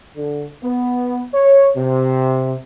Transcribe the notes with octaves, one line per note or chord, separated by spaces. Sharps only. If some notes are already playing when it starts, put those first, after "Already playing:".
D3
B3
C#5
C3